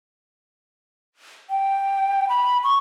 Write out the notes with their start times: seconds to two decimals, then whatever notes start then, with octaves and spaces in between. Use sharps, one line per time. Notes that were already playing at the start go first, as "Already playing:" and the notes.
1.50 G5
2.29 B5
2.64 C#6